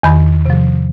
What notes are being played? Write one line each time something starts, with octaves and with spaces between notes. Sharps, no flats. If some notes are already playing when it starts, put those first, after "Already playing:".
E2 D#3 B5
C3 F3